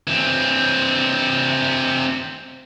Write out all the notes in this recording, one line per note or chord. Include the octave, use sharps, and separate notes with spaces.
E3 C4